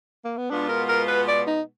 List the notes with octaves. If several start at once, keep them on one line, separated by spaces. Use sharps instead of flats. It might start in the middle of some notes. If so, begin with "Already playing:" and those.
A#3
B3
B2 G#3 B3 D4 F4
A#4
A#4
B4
D5
D#4